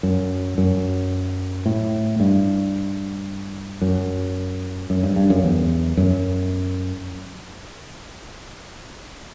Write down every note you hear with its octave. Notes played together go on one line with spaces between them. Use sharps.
F#2
F#2
A2
G2
F#2
F#2
G2
G2
F#2
E2
F#2